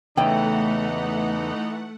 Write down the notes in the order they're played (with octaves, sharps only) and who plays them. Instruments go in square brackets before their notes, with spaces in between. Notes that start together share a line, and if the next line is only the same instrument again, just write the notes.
[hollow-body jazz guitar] E2 C#3 [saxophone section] E3 D#4 [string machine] A3 F#5 [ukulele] G5